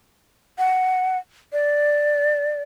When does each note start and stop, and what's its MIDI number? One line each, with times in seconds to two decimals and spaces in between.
0.58 1.17 78
1.53 2.62 74